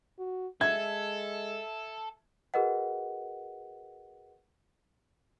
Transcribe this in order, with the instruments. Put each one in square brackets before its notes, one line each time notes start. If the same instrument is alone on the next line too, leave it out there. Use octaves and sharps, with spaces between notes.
[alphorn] F#4
[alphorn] G#3 [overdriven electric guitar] A4 [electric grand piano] E5 [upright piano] G#6
[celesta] F#4 G#4 A#4 B4 D#5 F#5